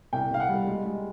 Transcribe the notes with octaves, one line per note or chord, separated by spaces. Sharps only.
C2 G5
C2 F5
F#5
G3
G#3
G#3